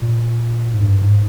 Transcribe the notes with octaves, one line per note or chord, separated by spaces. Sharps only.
A#2
G#2
G2
G#2